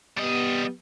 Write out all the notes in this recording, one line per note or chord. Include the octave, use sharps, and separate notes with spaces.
G3 B3 G4 D#5